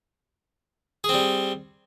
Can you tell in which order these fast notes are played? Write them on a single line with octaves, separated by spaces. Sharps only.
G#4 C4 G3